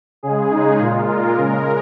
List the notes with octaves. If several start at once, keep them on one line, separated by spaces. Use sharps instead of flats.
C#3 G#3 G#4
D#4
A#2 G#3 F4
A#4
C#3 G#3